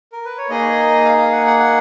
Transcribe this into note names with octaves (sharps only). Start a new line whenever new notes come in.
A#4
B4
C#5
A#3 D#4 G#4 D#5
F5
F5
F#5
F#5
F#5